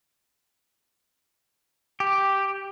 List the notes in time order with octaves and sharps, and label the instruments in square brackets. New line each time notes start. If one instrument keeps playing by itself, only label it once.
[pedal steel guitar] G4